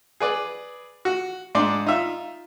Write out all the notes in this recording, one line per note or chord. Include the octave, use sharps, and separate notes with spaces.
G#4 B4 D5
F#4
G#2 D4 D5 C6 D6
D#4 F4 E5